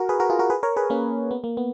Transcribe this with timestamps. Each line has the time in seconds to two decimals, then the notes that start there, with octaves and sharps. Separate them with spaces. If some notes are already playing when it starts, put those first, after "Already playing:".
Already playing: F#4 A#4
0.09 G#4 B4
0.20 F#4 A#4
0.30 F4 G#4
0.39 F#4 A#4
0.50 G#4 B4
0.63 A#4 C#5
0.76 G#4 B4
0.90 A#3 C#4
1.31 B3
1.44 A#3
1.57 B3